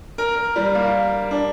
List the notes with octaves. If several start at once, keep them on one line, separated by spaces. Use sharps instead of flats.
A#4
A#4
G3
A#3
D4